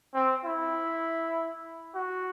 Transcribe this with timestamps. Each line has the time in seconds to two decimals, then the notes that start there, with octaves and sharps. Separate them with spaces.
0.15 C4
0.45 E4
1.95 F#4